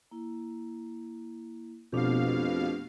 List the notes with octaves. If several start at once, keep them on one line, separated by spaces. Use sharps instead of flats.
A#3 E4
F2 B2 A3 D4 G4 F5